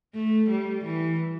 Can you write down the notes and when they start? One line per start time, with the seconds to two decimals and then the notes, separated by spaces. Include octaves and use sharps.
0.14 A3
0.50 G3
0.85 E3